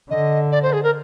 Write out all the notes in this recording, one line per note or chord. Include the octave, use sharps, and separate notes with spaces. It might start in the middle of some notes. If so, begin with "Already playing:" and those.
D3 D#5
D5
C5
G#4
A#4